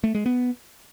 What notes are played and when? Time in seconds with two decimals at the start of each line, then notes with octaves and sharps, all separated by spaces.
0.04 A3
0.15 G#3
0.26 B3